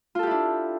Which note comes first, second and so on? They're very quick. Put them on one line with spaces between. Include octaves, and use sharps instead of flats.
F4 A4 G4 E4 D4